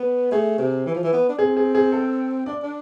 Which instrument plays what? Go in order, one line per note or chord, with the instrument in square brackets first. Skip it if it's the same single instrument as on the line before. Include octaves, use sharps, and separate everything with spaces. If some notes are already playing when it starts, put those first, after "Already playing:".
Already playing: [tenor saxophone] B3
[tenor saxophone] A3 [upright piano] G#4
[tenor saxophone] C3
E3
F3
E3
B3
D4
[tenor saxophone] C4 [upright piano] G#4
[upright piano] G#4
G#4
A4
[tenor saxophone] D4 [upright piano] D5
[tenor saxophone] D4